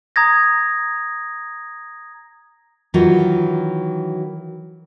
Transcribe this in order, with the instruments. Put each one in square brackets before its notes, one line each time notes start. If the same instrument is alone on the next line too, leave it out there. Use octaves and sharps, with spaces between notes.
[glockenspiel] A#5 D#6 G#6 A#6
[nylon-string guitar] D#3 E3 F#3 F4 F#4